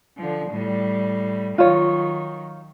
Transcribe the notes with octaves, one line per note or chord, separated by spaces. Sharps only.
D3 F3
A2 G3
D#3 F#3 F4 C#5